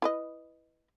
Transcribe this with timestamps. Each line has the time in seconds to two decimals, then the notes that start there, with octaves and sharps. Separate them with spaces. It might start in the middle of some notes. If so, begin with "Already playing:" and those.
0.02 E4 B4 D#5